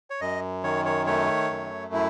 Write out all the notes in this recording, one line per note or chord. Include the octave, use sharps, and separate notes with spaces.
C#5
F#2 D#5
D#3 C#5
C#5
A3 C#5
F#2
E4